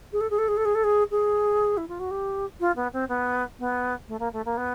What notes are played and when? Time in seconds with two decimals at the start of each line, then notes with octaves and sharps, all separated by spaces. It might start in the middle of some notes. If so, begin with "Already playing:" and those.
0.13 G#4
0.21 A4
0.30 G#4
0.38 A4
0.48 G#4
0.57 A4
0.65 G#4
0.75 A4
0.84 G#4
1.11 G#4
1.77 E4
1.88 F4
2.00 F#4
2.11 G4
2.60 F4
2.76 B3
2.93 C4
3.09 B3
3.59 B3
4.08 A3
4.20 A#3
4.33 A3
4.45 A#3
4.57 B3